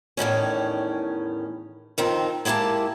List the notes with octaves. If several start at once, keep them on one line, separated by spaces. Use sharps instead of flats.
E2 A2 D#3 C#4
F2 D#3 C4
G#3 A#3 E4 G4 A5